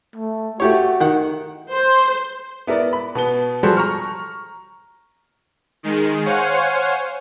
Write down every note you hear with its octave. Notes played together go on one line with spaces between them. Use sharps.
A3
A3 F#4 G4 C#5
D#3 F#5
C5
B3 E4 A#4 D5
B5
B2 B3 G7
F3 G3 F#4 G#4 A4 C5
A#5 C#6 F6
D#3 G#3
C5 C#5 F5 F#5 G#5